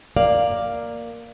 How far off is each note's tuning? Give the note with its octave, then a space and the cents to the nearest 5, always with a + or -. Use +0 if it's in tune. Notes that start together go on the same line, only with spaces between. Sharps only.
A#3 +0 D5 +5 F5 +0